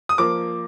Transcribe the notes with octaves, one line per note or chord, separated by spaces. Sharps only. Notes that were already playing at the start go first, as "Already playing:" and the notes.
D#6
F3 A#3 D6